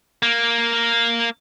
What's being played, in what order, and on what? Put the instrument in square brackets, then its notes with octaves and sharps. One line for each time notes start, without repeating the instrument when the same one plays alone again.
[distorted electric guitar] A#3